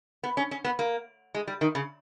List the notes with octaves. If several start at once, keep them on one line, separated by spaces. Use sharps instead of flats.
B3
C#4
C#4
B3
A#3
G#3
G3
D#3
C#3